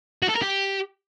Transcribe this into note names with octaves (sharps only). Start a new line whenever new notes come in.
F#4
A4
A#4
G4